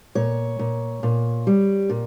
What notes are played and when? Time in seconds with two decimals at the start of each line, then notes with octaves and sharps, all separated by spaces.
0.15 A#2 C#5
0.59 A#2
1.03 A#2
1.47 G3
1.90 A#2